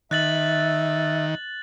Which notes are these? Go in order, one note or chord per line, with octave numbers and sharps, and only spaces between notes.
D#3 E5 F#6 A6 F#7